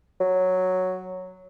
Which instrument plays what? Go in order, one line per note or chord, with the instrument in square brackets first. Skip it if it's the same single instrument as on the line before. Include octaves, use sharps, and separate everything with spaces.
[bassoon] F#3